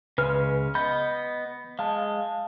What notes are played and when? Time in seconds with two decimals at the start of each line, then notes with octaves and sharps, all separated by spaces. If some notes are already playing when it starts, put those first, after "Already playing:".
0.18 C#2 C#3 G#3 B4 F6
0.75 B3 D#5 B5 G6
1.79 G#3 F5 A5